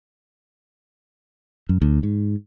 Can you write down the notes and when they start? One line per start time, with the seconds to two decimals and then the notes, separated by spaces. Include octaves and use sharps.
1.69 F#2
1.82 D2
2.03 G#2